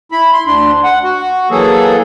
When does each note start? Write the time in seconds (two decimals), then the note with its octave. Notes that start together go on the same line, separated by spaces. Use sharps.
0.12 E4 B5
0.33 C6
0.47 D2 D4 C6
0.84 F#5
1.04 F#4
1.51 E3 F#3 A#3 G#4 A4